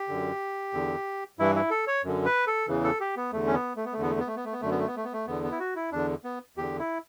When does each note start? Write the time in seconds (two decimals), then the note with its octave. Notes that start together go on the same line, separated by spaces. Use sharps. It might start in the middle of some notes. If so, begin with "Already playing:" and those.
Already playing: G4
0.08 F#2 D3
0.73 E2 D3
1.39 G2 E3 E4
1.55 E4
1.70 A4
1.87 C#5
2.04 F#2 D3
2.26 B4
2.47 A4
2.68 E2 C#3 E3
2.84 A4
3.00 G4
3.17 B3
3.32 E2 D3 A3
3.47 C#4
3.54 B3
3.76 A3
3.85 B3
3.93 A3
3.98 E2 D3 B3
4.10 A3
4.20 B3
4.27 A3
4.36 B3
4.45 A3
4.53 B3
4.61 F#2 D3 A3
4.71 B3
4.79 A3
4.87 B3
4.96 A3
5.04 B3
5.13 A3
5.27 E2 D3 B3
5.44 B3
5.51 E4
5.59 F#4
5.75 E4
5.92 E2 D3 D4
6.24 B3
6.57 E2 D3 G4
6.79 E4